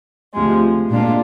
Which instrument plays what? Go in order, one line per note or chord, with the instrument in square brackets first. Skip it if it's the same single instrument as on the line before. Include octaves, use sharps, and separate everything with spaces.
[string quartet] D2 C3 F3 G#3
A#2 G#3 D4 F4